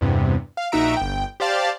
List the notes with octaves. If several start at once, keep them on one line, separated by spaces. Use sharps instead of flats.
E2 G2 C3
F5
A#1 D#4 F#4 E5 A#5 D7
G1 G5
G4 C5 D5 F5 A5